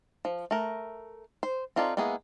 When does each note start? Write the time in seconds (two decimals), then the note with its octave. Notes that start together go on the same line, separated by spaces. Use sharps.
0.25 F3
0.51 A3 A#4
1.43 C5
1.76 C4 D#4 F4 A4 D5
1.97 G#3 A#3 B3 E4 G#4